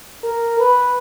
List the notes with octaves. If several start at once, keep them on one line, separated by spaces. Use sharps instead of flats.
A#4
B4